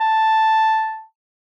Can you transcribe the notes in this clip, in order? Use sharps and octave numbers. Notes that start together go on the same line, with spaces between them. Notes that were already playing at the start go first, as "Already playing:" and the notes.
A5